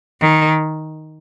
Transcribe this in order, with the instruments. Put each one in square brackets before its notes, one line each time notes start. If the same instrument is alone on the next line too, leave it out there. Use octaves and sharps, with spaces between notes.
[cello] D#3